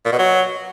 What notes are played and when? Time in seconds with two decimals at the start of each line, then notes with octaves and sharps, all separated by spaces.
0.05 A#2
0.12 B2
0.19 F#3